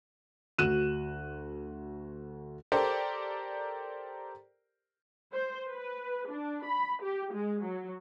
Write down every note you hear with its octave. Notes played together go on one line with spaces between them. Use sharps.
D2 F#4 F#6 D#7 E7
G4 A4 A#4 C5 D5
C5
B4
D4
B5
G4
G#3
F#3